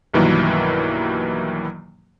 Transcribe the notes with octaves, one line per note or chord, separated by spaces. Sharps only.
B1 G2 D#3 E3 F#3 A#3